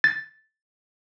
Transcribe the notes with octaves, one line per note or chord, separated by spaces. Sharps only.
A6